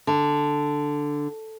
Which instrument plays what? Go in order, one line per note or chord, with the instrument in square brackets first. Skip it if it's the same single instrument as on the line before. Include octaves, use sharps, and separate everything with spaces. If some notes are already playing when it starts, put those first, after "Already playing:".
[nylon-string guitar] D3